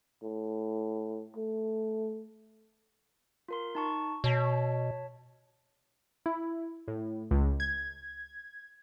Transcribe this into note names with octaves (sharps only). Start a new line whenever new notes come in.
A2
A3
F4 A#4 C6
D#4 A5 C#6
B2 C#5 A5 B6
E4
A2
C#2
G#6